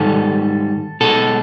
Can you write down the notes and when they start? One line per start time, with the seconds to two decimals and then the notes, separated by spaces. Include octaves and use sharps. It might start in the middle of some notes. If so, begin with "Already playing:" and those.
Already playing: G#2 D#3 G3 A4
1.01 B2 G#3 A4